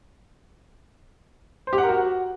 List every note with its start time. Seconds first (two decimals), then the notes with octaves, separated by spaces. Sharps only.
1.67 C5
1.73 G4
1.78 F#5
1.84 A#4
1.89 F#4